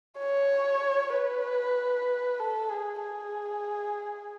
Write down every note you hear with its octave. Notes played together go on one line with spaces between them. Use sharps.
C#5
B4
A4
G#4
G#4